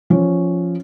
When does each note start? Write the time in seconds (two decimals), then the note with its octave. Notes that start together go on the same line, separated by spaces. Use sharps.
0.10 F3 C#4